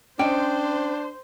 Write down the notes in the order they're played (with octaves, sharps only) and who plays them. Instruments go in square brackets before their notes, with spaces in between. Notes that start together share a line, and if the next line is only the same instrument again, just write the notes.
[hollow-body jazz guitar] C#4 D#5 [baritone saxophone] D4 [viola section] C5 [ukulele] G5